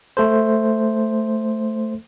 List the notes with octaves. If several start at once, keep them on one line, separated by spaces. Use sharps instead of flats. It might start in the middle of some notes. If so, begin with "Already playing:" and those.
A3 A4 C5